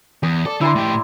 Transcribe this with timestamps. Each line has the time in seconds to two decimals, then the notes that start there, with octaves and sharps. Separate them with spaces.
0.23 E2 D#6
0.45 A4 D5
0.61 D3 E4 A#5 C6
0.76 A2 G4